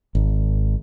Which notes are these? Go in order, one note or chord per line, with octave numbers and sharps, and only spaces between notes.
G#1